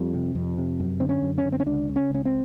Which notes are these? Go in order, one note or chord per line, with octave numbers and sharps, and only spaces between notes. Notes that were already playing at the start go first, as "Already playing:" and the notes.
Already playing: F2 G3
C3
F2
C3
F#2
D3 C4
C#4
F#2
C#4
D3
C4
C#4
C#2 D4
C#3
C#4
C#2 C#4
C4